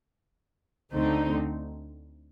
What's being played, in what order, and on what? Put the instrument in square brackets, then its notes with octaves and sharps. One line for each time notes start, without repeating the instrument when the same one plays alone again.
[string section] D2 D3 A3 C4 D#4